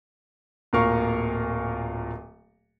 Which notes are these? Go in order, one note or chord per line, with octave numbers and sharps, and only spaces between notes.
D1 A#2 A#4 F5 C#6